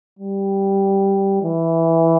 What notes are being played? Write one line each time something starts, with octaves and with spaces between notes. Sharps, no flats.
G3
E3